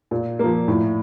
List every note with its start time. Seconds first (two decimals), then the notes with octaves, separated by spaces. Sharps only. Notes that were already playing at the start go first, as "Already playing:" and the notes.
0.11 A#2
0.39 F3 A#3
0.68 A2